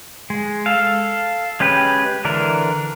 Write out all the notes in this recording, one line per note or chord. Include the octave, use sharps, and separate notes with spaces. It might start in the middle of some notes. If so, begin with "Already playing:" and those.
G#3
A4 F5
G#3 C#4 G4 B4
D3 E3 D4 A#4